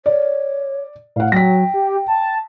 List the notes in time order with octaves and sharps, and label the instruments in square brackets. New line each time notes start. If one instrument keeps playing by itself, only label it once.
[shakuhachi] C#5 [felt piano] D5
[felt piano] A2 F#5 [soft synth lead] F5
[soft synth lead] F#3 [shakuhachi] G5 [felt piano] A#6 B6
[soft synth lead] G4
A5